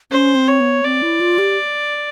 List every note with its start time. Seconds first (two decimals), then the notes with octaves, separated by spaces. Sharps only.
0.12 C#4 C5
0.35 C4
0.48 C#5
0.60 B3
0.84 C4 D5
1.02 E4
1.20 F4
1.38 G4